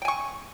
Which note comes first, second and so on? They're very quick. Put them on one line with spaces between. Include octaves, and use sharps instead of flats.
G5 G#5 C#6